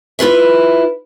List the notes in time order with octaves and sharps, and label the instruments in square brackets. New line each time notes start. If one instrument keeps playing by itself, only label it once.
[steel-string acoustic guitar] E4 F4 B4 E5